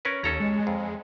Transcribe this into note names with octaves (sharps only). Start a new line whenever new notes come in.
C#4 A#4 B4
D#2 C#4 A4 A#5
G#3
F2